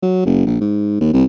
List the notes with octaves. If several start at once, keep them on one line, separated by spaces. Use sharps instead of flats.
F#3
F#1
A#1
G#2
D#2
C2